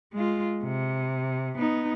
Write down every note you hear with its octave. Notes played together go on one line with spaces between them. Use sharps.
G#3 F4
C3
B3 D#4